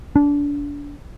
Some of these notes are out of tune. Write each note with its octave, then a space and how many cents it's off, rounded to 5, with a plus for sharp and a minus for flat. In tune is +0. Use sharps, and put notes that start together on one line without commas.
D4 -30